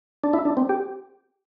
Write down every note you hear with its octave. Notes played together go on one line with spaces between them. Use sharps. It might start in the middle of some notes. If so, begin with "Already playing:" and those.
D4
E4
D4
C4
G4